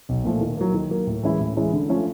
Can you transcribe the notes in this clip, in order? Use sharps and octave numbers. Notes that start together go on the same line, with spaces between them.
B1
A#2 F3 A3
D#3
F#3 A#3
D#3
F#3 A#3
A2
E3 G#3 C#4 E4
A2
E3 G#3 C#4 E4
D3
F3 A3 C#4 F4